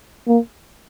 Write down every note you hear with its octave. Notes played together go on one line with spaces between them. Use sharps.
A#3